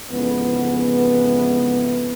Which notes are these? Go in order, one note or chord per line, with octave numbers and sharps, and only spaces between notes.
F2 G#2 C#3 E3 A3 B3